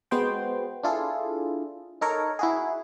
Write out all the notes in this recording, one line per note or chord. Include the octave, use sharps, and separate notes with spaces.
G#3 B3 F#4 C5 G5
D4 E4 F4 G#4 A4
D#4 A4 A#4 C#5
E4 F#4 G#4